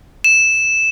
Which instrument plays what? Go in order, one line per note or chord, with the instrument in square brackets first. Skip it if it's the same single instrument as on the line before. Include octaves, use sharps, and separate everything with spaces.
[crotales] E7